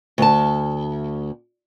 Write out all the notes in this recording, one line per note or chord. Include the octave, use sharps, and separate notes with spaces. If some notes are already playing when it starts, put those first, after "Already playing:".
D2 A5